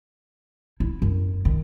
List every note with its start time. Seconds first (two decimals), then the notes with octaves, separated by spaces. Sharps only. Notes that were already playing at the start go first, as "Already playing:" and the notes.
0.80 E4
1.02 F#2
1.45 D#3